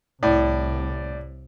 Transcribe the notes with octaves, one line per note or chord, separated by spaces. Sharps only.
C2 A2 D5